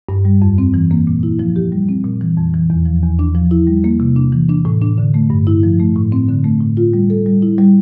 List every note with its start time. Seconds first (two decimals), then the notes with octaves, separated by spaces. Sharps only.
0.09 G2
0.25 G3
0.42 F2
0.58 C4
0.74 E3
0.91 A#3
1.07 A#2
1.23 E4
1.39 F3
1.56 G4
1.72 G3
1.89 C4
2.05 A#2
2.21 E3
2.37 F2
2.54 E3
2.70 E2
2.85 F3
3.02 E2
3.19 D4
3.35 F3
3.51 E4
3.67 G3
3.84 A#3
4.00 C3
4.16 D4
4.32 E3
4.49 D4
4.65 A2
4.82 D4
4.98 D3
5.14 A3
5.30 G2
5.47 E4
5.63 F3
5.80 A3
5.96 A2
6.12 C4
6.28 D3
6.44 A3
6.61 A2
6.77 F4
6.93 G3
7.10 A4
7.26 G3
7.42 E4
7.58 G3